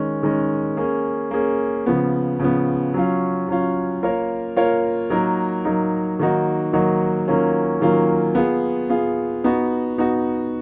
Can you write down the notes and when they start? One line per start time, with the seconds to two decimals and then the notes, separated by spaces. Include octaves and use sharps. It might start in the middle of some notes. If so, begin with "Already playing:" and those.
Already playing: D#3 G#3 C#4
0.23 D#3 G#3 C#4
0.77 A#3 C#4 G#4
1.31 A#3 C#4 G#4
1.86 C#3 F3 B3
2.40 C#3 F3 B3
2.94 F#3 C#4 F4
3.48 F#3 C#4 F4
4.03 A#3 F4 A#4 C#5
4.56 A#3 F4 A#4 C#5
5.10 F#3 A#3 D#4 A#4
5.65 F#3 A#3 D#4 A#4
6.19 D#3 F#3 A#3 D#4 F#4
6.73 D#3 F#3 A#3 D#4 F#4
7.28 D#3 F#3 A#3 C#4 F4
7.81 D#3 F#3 A#3 C#4 F4
8.35 B3 F4 G#4
8.89 B3 F4 G#4
9.44 B3 D#4 F#4
9.98 B3 D#4 F#4